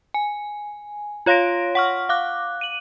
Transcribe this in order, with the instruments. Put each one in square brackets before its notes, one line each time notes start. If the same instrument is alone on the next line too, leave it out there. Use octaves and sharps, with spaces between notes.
[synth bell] G#5
F4 C#5 F5 C6 A#6 D7
F#5 C#6 F6
F5 D6 F#6
D#7 F#7